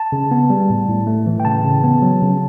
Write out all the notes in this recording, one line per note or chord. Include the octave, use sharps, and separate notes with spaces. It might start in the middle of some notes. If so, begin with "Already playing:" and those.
Already playing: A5
C#3
B3
G3
A2
A2
A3
E3
G5
C#3 A5
C#3
B3
F#3
C#3